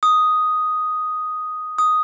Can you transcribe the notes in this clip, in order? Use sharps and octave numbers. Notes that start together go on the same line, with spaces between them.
D#6
D#6